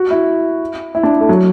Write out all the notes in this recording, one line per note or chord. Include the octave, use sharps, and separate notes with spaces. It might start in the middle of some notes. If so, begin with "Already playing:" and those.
Already playing: F#4
E4
E4
D4
A3
F#3